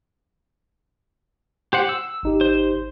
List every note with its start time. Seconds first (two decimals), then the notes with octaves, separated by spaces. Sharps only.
1.73 G4 C5 F#5
1.89 E6
2.23 G#1 D#4 G4
2.41 C5